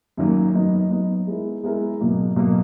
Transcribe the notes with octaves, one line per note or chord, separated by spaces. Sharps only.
F#2 D#3 F#3 A#3
F#3 B3 D#4
F#3 B3 D#4
G#3 B3 E4 A#4
G#3 B3 E4 A#4
B2 F#3 A#3
B2 F#3 A#3